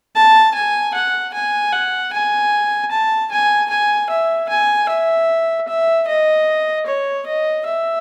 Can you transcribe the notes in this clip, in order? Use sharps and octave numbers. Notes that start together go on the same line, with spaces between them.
A5
G#5
F#5
G#5
F#5
G#5
A5
G#5
G#5
E5
G#5
E5
E5
D#5
C#5
D#5
E5